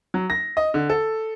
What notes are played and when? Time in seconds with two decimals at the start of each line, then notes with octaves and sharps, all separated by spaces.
0.14 F#3
0.30 A#6
0.57 D#5
0.74 D3
0.90 A4